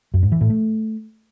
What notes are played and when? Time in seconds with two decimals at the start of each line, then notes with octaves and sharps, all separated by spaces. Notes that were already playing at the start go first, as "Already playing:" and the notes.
0.14 F#2
0.23 G#2
0.32 E3
0.41 A2
0.50 A3